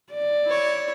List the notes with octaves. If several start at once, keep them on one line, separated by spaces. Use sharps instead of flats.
D5
E4 C#5